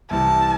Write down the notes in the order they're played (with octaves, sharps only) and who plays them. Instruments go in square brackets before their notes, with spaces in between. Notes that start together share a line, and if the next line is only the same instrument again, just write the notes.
[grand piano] C2 C3 E3 [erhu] A5